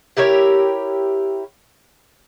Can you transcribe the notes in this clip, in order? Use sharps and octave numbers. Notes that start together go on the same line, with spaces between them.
E4 G4 A#4 C#5